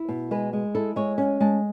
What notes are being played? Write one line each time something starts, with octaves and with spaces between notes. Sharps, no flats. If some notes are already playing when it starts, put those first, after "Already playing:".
Already playing: E4
B2
G#3 B4
G#3
E4 A4
G#3 C#5
C#4
G#3 A5